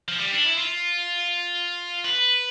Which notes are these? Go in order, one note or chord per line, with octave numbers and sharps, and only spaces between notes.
F3
G3
D4
E4
F4
B4